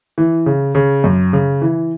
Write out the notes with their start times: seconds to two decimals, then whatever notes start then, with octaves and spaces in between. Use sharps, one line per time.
0.18 E3
0.46 C#3
0.75 C#3
1.04 F#2
1.33 C#3
1.62 E3